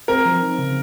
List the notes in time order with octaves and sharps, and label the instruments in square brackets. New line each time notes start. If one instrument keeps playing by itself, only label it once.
[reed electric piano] C4 [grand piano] A#4
[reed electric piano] F3
D#4
C#3